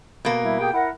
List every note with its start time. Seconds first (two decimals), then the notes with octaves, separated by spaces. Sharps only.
0.25 B2 A#3
0.44 G3 E4 E5
0.60 G4 G#4 G5
0.73 E4 A#4 F#5